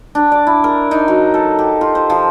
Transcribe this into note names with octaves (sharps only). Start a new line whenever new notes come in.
D4
D5
E4
A#4
D#4
F#3
A4
G4
F4
C5
F3